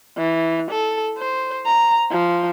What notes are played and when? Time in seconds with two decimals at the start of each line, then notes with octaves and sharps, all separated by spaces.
0.18 E3
0.71 A4
1.18 C5
1.66 A#5
2.11 F3